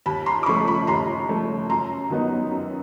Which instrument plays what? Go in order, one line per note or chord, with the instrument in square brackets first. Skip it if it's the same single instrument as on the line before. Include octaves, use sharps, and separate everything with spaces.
[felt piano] D#2 A5 B5
A#5 C6
D6
C#3 F3 A3 B5 C#6
B5 C#6
D#2 A#5 C6
C#3 F3 A3
F#2 A#5 C6
D#3 F#3 B3 D#4
F#2